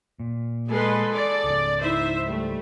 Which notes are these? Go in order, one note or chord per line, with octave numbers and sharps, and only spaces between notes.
A#2
G#3 G#4 A4 B4 C6
D5
C#2 G#2
D#4 E4 C5 E5
G3 A3